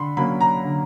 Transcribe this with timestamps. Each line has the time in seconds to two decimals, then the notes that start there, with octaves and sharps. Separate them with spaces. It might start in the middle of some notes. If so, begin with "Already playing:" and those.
Already playing: D3 B5 C6
0.17 F#3 A#3 C#4 B5
0.41 A#5
0.64 D3